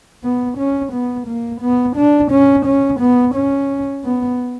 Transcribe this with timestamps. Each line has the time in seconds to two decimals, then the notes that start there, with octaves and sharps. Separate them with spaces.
0.24 B3
0.58 C#4
0.93 B3
1.27 A#3
1.62 B3
1.97 D4
2.32 C#4
2.66 C#4
3.01 B3
3.35 C#4
4.05 B3